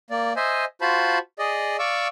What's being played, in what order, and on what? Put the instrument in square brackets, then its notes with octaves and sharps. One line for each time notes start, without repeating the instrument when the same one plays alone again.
[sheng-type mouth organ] A#3 D5
C5 D#5 E5 G#5
F4 F#4 C5 A5 B5
G#4 D5 D#5
D5 F5 C#6 D6 E6